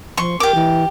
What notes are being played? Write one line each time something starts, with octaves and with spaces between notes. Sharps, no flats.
F3 C6 C#6
G4 A#4 D6
E3